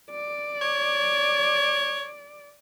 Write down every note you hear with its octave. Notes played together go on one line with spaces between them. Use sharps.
D5
C#5